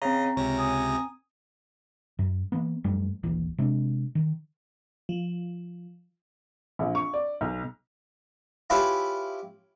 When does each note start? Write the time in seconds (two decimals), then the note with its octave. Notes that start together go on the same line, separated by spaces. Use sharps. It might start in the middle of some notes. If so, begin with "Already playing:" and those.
0.02 C#3 C4 D#5 A#5
0.36 C#2 C3 C#4 A#6
0.59 G#5 D#6
2.19 F#2
2.52 E3 A#3 B3
2.84 F#2 F3 G3 A3
3.23 D#1 A#1 E3
3.58 C3 G#3 D4
4.15 D#3
5.09 F3
6.79 A#1
6.95 C#6
7.14 D5
7.41 B1
8.70 E4 F4 G4 B4 C#5 G#5